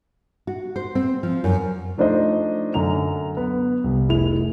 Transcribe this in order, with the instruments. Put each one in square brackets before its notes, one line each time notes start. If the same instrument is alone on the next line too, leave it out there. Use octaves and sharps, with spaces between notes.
[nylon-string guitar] F#4
C5
C4
F3
F#2
[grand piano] F3 A3 D4 D#4 C5 D#5
F#2 D3 A4 A#5 F7
B3
C2
F1 E4 G#4 F7